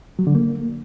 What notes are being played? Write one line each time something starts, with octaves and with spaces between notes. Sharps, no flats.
F#3
D3
A#3